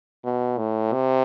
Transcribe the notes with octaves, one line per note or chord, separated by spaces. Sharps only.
B2
A2
C3